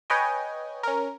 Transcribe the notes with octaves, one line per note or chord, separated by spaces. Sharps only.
B4 C#5 D#5 G5 G#5
C#4 A#4